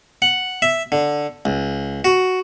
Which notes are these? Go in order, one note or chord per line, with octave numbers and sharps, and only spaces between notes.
F#5
E5
D3
C#2
F#4